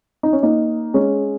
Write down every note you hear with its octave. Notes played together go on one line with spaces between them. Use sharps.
D#4
C#4
A#3 D#4
G#3 C#4